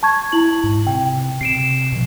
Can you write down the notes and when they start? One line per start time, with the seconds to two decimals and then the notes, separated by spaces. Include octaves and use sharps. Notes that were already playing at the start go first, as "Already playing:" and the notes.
0.03 A5 C#6 G#6
0.32 E4 F#7
0.64 G#2
0.87 C3 G5
1.41 C3 C7 D7 E7
1.92 B2 F3